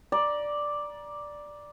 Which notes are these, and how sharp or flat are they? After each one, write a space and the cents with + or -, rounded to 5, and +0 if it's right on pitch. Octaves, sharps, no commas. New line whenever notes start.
D5 +0 A#5 +25